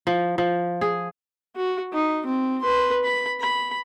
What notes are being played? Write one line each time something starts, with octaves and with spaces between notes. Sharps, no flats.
F3
F3
G#4
F#4
D#4
C4
B4 C6
B5
B5